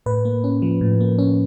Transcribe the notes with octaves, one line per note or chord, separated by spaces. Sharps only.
A2 B4
A#3
C#4
F3
A2
A#3
C#4